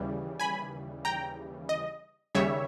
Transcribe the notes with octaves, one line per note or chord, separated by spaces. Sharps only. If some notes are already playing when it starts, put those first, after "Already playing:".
Already playing: D#2 C#3 E3 G3
G#5 B5
G5 A#5
D#5
D#2 C#3 G3 C#5 E5